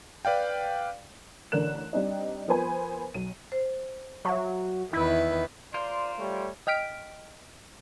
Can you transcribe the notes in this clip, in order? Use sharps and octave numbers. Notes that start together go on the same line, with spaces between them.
B4 D5 F5 G5
A1 D3 D4 A#4 F#6 E7
G3 C4 D4 D#4
F3 B3 A#4 C5 G#5 B5
B1 D#7
C5
F#3 E5 C#6
E2 D#3 E4 B4
F4 A#4 C5 D5 C6
G3 A3 C#5
D#5 G5 F6 B6 D7